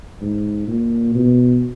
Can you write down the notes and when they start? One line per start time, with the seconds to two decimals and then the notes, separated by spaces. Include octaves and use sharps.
0.21 G#2
0.68 A#2
1.15 B2